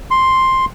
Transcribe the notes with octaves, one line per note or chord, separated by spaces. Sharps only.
C6